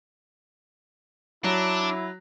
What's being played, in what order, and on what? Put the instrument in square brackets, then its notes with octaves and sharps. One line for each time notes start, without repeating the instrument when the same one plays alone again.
[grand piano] F#3 [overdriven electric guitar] D4 [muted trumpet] E4